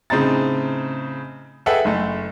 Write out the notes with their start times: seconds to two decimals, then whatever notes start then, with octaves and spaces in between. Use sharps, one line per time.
0.10 A2 C#3 C4 D#4 A#5 A6
1.66 G#4 A4 B4 E5 F#5 G5
1.85 F#1 A3